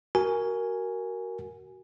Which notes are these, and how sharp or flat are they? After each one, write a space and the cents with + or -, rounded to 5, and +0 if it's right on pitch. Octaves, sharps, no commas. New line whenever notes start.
F#4 +20 A#4 +0 G#5 +0